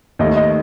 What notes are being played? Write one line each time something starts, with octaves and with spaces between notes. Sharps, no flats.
D#2 D#3 A3 D#5
D#5